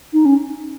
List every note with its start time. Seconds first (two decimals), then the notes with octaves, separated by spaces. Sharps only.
0.13 D#4
0.25 C#4